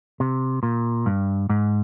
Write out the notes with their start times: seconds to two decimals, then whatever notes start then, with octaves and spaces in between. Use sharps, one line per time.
0.20 C3
0.63 A#2
1.06 G2
1.49 G#2